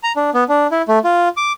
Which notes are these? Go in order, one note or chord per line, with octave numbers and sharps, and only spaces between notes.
A#5
D4
B3
D4
E4
A3
F4
D6